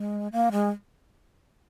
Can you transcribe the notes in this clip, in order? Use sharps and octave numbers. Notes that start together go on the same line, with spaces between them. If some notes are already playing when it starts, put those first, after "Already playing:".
Already playing: G#3
A#3
G#3